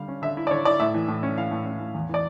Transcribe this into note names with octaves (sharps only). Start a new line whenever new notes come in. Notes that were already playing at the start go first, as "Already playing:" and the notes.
Already playing: D3 G3 F5
C#4
D3 E5
E4
D5
D3 C#5
E4 D5
A2 E5
E3
A2
C#4
E3 F5
A2
C#4
A2
E2
E3 D5